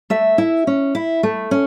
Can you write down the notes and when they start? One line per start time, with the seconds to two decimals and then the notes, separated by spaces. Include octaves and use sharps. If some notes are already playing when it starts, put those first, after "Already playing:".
0.10 A3 E5
0.38 E4
0.67 C#4
0.95 E4
1.23 A3
1.51 C#4